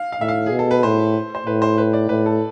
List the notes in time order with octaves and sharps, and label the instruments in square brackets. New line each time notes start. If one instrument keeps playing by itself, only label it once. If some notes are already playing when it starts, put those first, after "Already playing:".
Already playing: [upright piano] F5
F5
[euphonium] A2 [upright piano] E5
[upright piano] F5
G#4
[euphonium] B2
[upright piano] A4
B4
[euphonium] A2 [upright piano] C5
[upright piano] C5
[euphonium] A2 [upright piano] B4
[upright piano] C5
B4
D5
[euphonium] A2 [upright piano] B4
[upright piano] A4